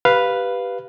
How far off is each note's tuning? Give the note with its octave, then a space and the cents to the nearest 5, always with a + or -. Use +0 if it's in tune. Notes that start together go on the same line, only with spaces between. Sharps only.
G4 -5 B4 +0 F5 +0